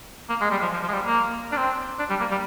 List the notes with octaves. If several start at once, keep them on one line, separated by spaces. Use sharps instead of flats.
A#3
G#3
G3
F3
F3
F3
G#3
G3
A#3
D4
C4
D4
G3
A#3
G3